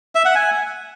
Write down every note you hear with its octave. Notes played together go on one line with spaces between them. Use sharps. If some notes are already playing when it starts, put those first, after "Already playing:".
E5
F#5
G#5